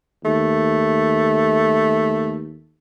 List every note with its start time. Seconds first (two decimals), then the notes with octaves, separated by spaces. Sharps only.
0.25 D#2 A3